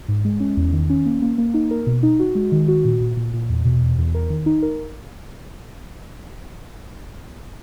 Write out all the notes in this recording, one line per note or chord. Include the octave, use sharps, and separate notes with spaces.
G#2
G#3
C#4
E2
D#3
C#4
A#3
A#3
A#3
D#4
A#4
B2
D#4
F#4
G#3
D#3
F#4
A#2
A#2
A#2
A#2
E2
B2
E2
E2
A#4
D#3
D#4
A#4